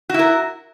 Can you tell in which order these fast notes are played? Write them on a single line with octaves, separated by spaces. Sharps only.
F#4 E4 A#4